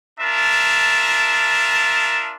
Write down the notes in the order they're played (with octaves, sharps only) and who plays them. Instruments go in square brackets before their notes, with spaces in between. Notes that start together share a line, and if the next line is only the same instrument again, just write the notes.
[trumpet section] D4 F4 A#4 E5 A5